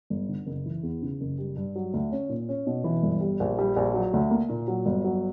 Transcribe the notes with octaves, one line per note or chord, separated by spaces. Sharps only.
G1
D3
F#1
E3
E2
C#3
F#1
G3
G2
F#3
D2
C#4
A#2
C#4
B2
E3
G1
G3
A#1
G3
A#1
F#3
D2
A#3
A#2
F#3
G1
F#3